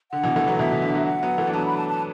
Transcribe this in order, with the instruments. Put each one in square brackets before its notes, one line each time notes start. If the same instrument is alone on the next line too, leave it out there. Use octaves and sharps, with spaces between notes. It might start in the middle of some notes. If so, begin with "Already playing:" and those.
[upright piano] D3 [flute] F#5
[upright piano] B2 E3
E3 A3
F#3 B3
[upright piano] B2 E3 [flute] E5
[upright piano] B2
D3
D3 F#3
[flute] F#5
[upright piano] F#3 B3
E3 A3
D4
[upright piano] F#3 B3 [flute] A5
[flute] B5
A5
A5